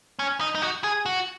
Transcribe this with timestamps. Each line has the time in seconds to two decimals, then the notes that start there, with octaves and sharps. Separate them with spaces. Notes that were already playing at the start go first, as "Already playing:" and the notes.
0.19 C#4
0.41 D#4
0.55 D#4
0.62 F#4
0.84 G#4
1.06 F#4